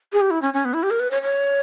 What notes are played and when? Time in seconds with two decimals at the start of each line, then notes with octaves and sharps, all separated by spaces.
0.13 G#4
0.21 G4
0.31 E4
0.42 C#4
0.54 C#4
0.65 B3
0.74 E4
0.83 G4
0.91 A#4
1.00 B4
1.11 C#5
1.22 C#5